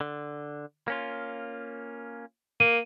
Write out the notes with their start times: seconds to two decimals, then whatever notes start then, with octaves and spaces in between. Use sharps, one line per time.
0.01 D3
0.88 A#3 C#4 F4
2.60 A#3 D#7